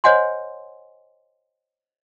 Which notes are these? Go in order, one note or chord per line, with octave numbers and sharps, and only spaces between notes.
C5 C#5 D#5 F#5 G#5 C6